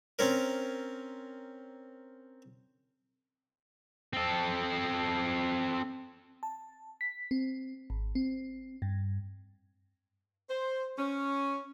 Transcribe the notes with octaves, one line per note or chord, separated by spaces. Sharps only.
C4 C#4 A#4
C4 A4
A5
B6
C4
G#1
C4
G2
C5
C#4